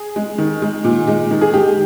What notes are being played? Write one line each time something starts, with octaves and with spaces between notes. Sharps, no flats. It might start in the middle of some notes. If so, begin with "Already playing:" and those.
Already playing: G#4
G#3
D#3
G#3
A#2
G#3
D#3
G#4
G#3 G4